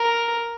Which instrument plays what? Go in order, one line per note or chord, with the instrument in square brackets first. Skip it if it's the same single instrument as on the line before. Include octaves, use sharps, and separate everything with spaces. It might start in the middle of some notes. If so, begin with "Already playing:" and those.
Already playing: [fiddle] A#4